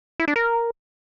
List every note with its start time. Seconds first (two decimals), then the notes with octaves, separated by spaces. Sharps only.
0.20 E4
0.28 D4
0.36 A#4